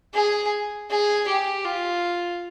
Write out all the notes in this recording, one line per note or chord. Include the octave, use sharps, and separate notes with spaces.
G#4
G#4
G4
F4